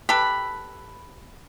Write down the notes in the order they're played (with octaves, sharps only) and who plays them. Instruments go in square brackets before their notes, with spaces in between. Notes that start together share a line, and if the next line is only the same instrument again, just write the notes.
[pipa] G4 A4 B4 [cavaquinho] B5